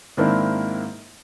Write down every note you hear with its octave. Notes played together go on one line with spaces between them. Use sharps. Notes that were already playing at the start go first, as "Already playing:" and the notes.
G#2 D#3 A#3 C4 D4 E4